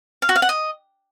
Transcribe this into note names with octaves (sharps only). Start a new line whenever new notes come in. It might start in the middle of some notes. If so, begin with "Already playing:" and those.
F5
F#4
F5
F#5
D#5